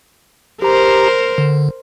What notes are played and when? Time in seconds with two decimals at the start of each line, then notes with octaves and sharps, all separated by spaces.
0.62 G4 A#4 C5 A#5
1.38 D3